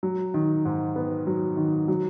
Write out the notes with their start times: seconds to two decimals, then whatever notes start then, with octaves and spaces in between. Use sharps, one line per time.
0.03 F#3
0.34 D#3
0.65 G#2
0.96 B3
1.27 F#3
1.57 D#3
1.88 F#3